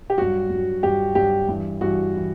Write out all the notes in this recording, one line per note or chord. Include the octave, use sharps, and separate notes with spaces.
G4
G2 F#3 F#4
G2 F#3
G2 F#3 G4
G2 F#3 G4
G2 E3
G2 E3 F#4
E3